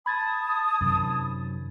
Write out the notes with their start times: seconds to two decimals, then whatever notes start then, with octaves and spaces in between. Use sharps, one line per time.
0.06 A5 B5 D#6 G#6 A6
0.81 F#2 C3 D#3